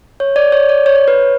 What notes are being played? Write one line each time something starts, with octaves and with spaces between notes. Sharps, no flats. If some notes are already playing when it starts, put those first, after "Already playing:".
C#5
D5
C#5
D5
C#5
C#5
B4